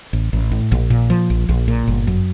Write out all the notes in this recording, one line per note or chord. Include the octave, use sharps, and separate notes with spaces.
A1
A1
A2
A#1
A#2
F3
A#1
A#1
A#2
G1
F#2